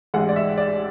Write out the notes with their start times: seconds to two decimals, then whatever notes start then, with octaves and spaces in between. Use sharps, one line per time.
0.14 A1 G#2 G#3 F#5
0.29 D5
0.36 E5
0.58 D5